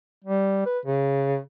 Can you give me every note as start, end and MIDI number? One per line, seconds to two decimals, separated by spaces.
0.25 0.63 55
0.66 0.79 71
0.85 1.39 49